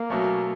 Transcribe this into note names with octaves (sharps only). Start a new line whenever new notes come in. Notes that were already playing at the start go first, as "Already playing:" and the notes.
Already playing: A#3
B2 F#3 A3 C#4